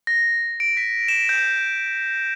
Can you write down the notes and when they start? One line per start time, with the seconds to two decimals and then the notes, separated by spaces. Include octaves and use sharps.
0.07 A#6
0.60 D7
0.77 B6
1.08 E7
1.29 G6